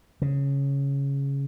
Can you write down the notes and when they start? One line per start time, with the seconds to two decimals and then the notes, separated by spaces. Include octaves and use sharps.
0.22 C#3